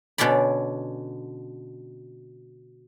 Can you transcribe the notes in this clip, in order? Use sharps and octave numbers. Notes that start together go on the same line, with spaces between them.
B2 D3 C#4 D5 B5